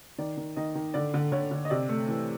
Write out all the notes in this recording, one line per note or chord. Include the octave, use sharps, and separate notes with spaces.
D#3 D5
D#3
D#3 D#5
D#3
D3 D5
D3
D3 C#5
D3
D#5
C3 D5
A3
E3